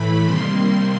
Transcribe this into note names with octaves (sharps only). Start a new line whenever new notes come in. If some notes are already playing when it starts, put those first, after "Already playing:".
Already playing: A2 E3 A3 B5
C3 D#3 G3 A#3 C6